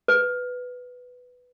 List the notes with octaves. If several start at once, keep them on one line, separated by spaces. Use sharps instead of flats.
B4